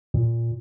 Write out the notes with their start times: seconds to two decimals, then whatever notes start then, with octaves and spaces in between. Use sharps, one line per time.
0.14 A#2